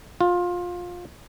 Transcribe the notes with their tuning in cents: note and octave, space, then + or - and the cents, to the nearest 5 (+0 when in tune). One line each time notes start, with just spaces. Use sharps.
F4 +20